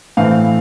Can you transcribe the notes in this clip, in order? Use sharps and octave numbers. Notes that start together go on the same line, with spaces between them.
A2 E3 A3 C4 F5